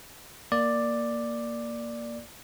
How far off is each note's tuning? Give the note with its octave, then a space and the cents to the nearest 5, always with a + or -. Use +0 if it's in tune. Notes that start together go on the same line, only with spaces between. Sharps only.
A#3 +0 D5 +5